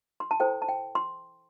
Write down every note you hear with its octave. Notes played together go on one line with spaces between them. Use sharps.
C6
A5
E4 A4 C5 G5
A5
G5
C6